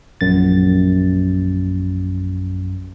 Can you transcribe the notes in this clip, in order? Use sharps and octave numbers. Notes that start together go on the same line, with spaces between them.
A#1 F#2 A6